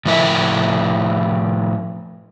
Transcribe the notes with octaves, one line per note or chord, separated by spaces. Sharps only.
A2 F3 E4 A#4 E5